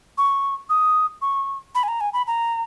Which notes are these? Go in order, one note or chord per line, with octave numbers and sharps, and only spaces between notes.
C#6
D#6
C#6
B5
G#5
A#5
G#5
B5
A#5